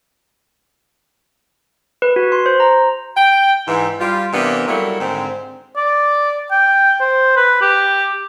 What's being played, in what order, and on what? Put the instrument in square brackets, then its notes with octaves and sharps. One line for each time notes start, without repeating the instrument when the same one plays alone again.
[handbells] B4
F#4
C6
C5
A#5
[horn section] G5
G#2 E3
G3 F4
C3 E3 A#3 B3 D4
F#3 G3 A3 A#3 E4
G#2 D3 D#3 C4
[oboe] D5
G5
C5
B4
G4